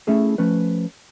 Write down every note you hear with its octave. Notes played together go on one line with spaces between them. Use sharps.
A3 C#4 E4 G#4 A4
F3 A3 C#4 B4